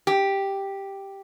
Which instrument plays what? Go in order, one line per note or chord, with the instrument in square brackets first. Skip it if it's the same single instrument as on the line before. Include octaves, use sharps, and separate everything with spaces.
[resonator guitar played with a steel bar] G4